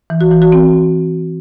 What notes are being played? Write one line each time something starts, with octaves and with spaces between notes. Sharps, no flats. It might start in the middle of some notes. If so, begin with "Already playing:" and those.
E3
F#4
E3
F#4
C4